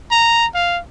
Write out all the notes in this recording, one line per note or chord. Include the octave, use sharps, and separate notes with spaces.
A#5
F5